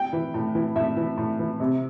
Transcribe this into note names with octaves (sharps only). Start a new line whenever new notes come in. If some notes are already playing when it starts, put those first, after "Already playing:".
Already playing: G5
E3
A2
E3
A2 E5
E3
A2
E3
C3